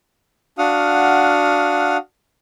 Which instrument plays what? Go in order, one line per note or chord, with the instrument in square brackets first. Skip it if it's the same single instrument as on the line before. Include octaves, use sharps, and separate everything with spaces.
[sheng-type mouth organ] D4 F#4 F5 F#5 D#6 F6